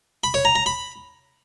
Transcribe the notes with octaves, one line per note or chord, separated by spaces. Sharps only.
B5
C#5
A#5
A#5
B5